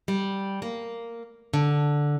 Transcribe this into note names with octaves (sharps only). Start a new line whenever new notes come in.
G3
A#3
D3